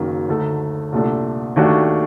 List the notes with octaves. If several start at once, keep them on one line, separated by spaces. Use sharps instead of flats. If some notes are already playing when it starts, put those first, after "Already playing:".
Already playing: F#1 F#2 D#3 F#3 A#3
D2 D3 A3 D#4 A4
C2 A#2 A3 D4 A4
D#2 D#3 A3 D4 F#4